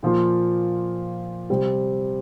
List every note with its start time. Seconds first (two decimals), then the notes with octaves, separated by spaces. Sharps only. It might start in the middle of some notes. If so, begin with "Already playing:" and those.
0.03 A#2 F3 A#3 F4
1.50 C3 G3 C4